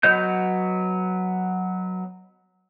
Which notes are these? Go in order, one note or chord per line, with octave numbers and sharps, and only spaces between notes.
F#3 B3 C#5 D#5 G6